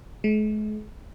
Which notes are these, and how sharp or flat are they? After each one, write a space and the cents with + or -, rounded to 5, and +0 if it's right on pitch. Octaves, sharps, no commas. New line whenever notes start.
G#3 +45